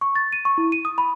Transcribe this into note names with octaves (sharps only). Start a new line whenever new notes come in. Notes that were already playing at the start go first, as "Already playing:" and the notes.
C#6
A6
D#7
C#6
E4
D#7
D#6
B5